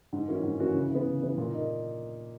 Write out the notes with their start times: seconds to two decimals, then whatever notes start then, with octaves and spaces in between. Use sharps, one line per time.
0.13 G#2
0.28 E3 A#3 C#4 F#4
0.43 G#2
0.59 E3 A#3 C#4 F#4
0.74 C#3
0.91 E3 B3
1.06 C#3
1.22 E3 B3
1.38 A#2
1.53 A#3 D#4